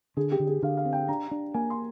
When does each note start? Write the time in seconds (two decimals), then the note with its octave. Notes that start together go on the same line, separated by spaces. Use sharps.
0.17 D3 G#4
0.32 G4
0.40 D3
0.47 G#4
0.63 D3 F5
0.77 F5
0.85 C4
0.93 G5
1.08 D4 A#5
1.31 D4
1.54 A#3 G#5
1.70 C6